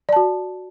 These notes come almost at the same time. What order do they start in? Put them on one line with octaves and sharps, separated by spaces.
D5 A5 F#4